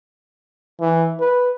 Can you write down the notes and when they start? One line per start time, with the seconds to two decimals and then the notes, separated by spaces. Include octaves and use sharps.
0.80 E3
1.20 B4